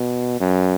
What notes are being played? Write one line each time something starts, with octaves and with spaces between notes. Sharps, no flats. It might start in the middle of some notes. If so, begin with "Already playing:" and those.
Already playing: B2
F#2